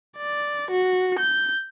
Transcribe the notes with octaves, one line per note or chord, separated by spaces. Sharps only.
D5
F#4
G6